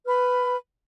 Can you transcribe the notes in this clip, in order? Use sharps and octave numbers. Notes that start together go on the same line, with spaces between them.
B4 B5 F6